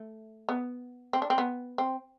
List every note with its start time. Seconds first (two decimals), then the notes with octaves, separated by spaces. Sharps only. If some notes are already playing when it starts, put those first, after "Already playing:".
Already playing: A3
0.49 B3
1.13 C4
1.22 D4
1.30 C4
1.38 B3
1.78 C4